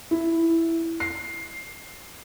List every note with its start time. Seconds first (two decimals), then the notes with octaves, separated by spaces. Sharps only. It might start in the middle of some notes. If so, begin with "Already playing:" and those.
0.11 E4
1.00 C7